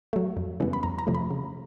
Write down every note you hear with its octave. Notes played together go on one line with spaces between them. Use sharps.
F#3 A3
F2
C#3 E3 G3 B3
B5
F2 A#5
A#5
C3 F3 A3
B5
C#3